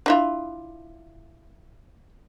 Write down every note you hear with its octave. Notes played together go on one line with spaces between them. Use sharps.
D4 E4 F4